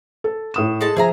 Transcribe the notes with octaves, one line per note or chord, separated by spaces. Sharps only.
A4
A2 D#6 E7
G#3 A4 A5
F3 G#4 E5 G#5 A#5